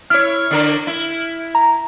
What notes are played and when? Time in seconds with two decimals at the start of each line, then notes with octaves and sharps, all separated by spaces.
0.10 E4 C#5 F6
0.51 D3 D4 A#4
0.87 E4
1.55 A#5